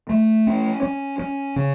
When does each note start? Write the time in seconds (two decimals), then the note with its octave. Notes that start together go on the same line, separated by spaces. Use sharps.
0.09 A3
0.47 C#4
0.83 C#4
1.20 C#4
1.56 C#3